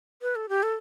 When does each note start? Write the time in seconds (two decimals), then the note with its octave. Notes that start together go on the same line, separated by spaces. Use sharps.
0.22 B4
0.36 A4
0.49 G4
0.63 A4